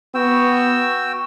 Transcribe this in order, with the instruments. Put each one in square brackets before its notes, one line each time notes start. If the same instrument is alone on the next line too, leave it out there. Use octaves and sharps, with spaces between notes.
[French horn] B3 [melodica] F#4 G5 E6